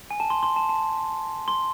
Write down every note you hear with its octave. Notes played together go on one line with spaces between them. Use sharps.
G#5
A5
C6
C6
A5
A5
C6